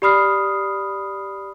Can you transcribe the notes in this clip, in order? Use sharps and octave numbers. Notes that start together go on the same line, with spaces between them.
G4 D5 B5 D#6 F6 C7